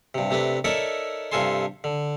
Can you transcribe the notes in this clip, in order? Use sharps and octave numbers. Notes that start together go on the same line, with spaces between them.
G2 C3
C3 A3 D4 B4
D#4 A4 A#4 C#5 D5 E5
G2 C3 F4 A4 G#5 C6
D3